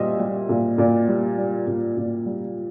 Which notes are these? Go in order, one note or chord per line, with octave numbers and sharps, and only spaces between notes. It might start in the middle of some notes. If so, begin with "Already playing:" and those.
Already playing: A#2 G3 C5 D#5 E5
G3
A#2
A#2 D5
G3
G3
A#2
A#2
G3